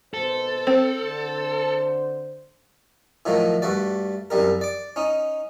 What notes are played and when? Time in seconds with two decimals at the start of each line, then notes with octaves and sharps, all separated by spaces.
0.14 G#1 B2 A4 C5
0.67 C4
1.03 D3 C5
3.26 A2 D#3 F3 F#3 A3
3.62 G2 A3 F#4 D5
4.30 C2 F#2 G3 A#4
4.61 D5 D6
4.96 C#4 D#4